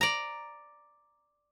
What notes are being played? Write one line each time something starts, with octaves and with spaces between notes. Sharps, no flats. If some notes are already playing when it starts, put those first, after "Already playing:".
D5 A#5